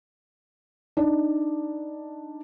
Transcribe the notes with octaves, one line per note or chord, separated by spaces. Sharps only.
D4 D#4